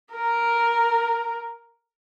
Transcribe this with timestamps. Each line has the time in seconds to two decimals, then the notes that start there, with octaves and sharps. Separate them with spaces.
0.12 A#4